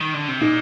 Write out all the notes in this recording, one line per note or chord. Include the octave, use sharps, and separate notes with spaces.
D#3
D3
C3
A#2 D#4